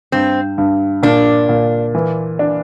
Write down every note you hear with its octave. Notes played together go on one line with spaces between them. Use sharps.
G2 C4
G2
A#2 D4
A#2
E3
D4